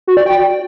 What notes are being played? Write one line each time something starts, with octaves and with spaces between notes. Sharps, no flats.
F#4
D5
G5